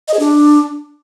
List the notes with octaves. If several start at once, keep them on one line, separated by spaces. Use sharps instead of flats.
D#5
G#4
D4